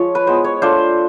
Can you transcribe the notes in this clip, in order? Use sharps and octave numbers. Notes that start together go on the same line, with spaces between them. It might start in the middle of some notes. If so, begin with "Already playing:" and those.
Already playing: F3 G#3 F4 C#5
B4
G#3 B3 E4 C5
C#5
A3 D4 F4 C5